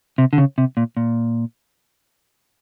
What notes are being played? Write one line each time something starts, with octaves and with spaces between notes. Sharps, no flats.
C3
D3
C#3
C3
A#2
A#2